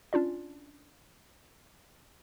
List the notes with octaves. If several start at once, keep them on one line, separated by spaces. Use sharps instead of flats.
C#4 D4 F4 D5